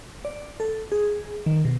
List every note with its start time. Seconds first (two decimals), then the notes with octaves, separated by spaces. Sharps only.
0.25 D5
0.60 A4
0.92 G#4
1.46 D#3
1.65 B2